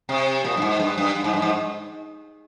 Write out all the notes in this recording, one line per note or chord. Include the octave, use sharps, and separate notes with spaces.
C3
A#2
G2
G#2
G2
G2
G2
G#2
G2
G#2